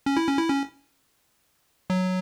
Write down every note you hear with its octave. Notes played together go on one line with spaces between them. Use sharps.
C#4
E4
C#4
E4
C#4
F#3